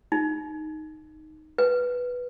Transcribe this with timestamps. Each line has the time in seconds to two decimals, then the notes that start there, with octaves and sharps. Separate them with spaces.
0.12 D#4
1.58 B4